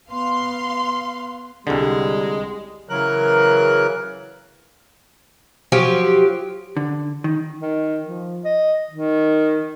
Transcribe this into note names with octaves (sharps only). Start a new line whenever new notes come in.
B3 F5 C6
C2 D3 G3 G#3
C#3 E3 F#3 A#4 F#6
F3 F#3 G4
D3
D#3
D#3
F3
D#5
D#3